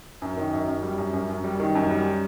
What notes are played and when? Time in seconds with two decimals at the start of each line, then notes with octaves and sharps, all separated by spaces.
0.22 F#2
0.37 D#3
0.53 F#2
0.68 F#2
0.83 G3
0.98 F#2
1.13 F#2
1.29 F#2
1.44 G3
1.60 D#3
1.75 F#2
1.91 G3